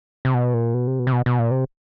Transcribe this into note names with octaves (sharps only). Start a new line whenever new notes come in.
C3
B2
A#2
B2
C3
B2
C3
B2
B2
A#2
C3